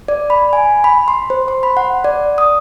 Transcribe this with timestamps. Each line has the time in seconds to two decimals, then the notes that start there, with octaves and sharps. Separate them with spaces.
0.08 D5
0.30 B5
0.53 G#5
0.84 B5
1.08 C6
1.30 C5
1.48 C6
1.63 B5
1.77 F#5
2.04 D5
2.38 D#6